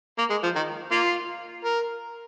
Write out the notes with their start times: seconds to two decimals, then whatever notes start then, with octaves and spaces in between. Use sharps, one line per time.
0.18 A#3
0.30 G#3
0.43 F3
0.55 D#3
0.91 A#3 F4
1.65 A#4